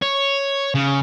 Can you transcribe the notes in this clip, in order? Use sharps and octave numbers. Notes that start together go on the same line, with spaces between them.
C#5
C#3